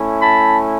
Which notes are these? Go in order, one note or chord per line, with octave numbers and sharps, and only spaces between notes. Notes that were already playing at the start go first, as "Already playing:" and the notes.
Already playing: A3 C#4 E4
A5 B5